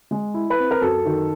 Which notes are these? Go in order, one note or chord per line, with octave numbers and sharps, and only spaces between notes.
G#3
E4
B4
C4
A#4
F#2 A4
D#3